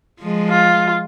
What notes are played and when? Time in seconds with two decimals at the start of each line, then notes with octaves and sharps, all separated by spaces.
0.21 F3 G#3
0.50 F4